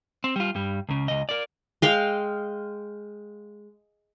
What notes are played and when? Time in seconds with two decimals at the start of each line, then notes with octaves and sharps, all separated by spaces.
0.24 C4
0.36 G3 F4
0.55 G2 G3
0.89 C#2 C#3
1.08 C#2 D#5
1.29 A#4 D5
1.82 G#3 F5 G5